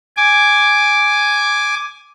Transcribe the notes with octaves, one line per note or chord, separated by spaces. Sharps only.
G#5 D6